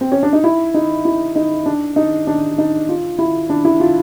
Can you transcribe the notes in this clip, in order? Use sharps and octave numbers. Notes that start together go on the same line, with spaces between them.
C4
C#4
D4
D#4
E4
D#4
E4
D#4
D4
D#4
D4
D#4
F4
E4
D4
E4
F4